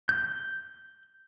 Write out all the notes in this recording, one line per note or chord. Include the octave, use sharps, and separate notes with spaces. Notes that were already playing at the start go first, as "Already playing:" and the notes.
G6